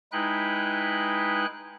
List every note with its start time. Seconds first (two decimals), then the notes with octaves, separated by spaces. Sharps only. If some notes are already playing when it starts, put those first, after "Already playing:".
0.12 G#3 D#4 E4 B4 G5 F#6